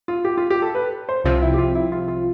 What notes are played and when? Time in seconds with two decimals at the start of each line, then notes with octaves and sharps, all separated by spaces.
0.08 F4
0.25 G4
0.37 F4
0.50 G4
0.62 A4
0.75 B4
1.09 C5
1.24 C2 C3 F3 C4 F4
1.42 E4
1.54 G4
1.58 F4
1.75 E4
1.92 F4
2.08 F4